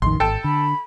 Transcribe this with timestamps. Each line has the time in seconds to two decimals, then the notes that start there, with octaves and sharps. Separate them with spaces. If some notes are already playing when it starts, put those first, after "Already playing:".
0.02 A1 F2 D#3 C6
0.20 G#1 A4 G5
0.44 D3 B5